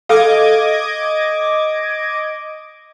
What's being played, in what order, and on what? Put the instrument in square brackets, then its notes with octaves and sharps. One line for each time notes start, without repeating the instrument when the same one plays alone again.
[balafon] A4 F5 [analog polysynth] D#5 D6 G#6